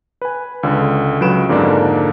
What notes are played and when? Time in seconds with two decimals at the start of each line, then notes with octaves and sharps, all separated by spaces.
0.22 B4 G#5
0.63 C#2 D3
1.21 C#2 F#3 B4 D7 E7
1.49 F2 G#2 D3 A#3 D4